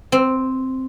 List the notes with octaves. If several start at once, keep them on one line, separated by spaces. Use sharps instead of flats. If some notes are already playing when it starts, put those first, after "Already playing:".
C4